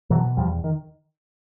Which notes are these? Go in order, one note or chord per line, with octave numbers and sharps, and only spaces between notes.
B2 E3 F#3
E2 F3 G3
D#3